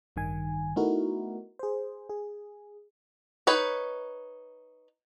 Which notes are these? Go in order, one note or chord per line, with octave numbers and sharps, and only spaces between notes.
A1 G2 D#3 G#5
A3 B3 D#4 E4 F#4 A#4
G#4 C5
G#4
D#4 B4 C#5